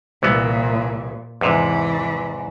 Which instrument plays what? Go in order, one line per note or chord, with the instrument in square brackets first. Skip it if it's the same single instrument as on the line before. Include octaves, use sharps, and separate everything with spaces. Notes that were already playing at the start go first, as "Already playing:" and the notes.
[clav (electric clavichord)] C2 E3 B3 [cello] A#2
[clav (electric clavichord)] E2 G#2 C3 [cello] E3